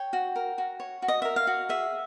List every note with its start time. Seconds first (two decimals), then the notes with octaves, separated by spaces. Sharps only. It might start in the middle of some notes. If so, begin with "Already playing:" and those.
Already playing: C#5 G5
0.13 F#4
0.36 A#4
0.58 F#4
0.80 C#5
1.02 F#4
1.08 D#5
1.22 A#4 E5
1.36 F5
1.47 F#4
1.69 G#4 E5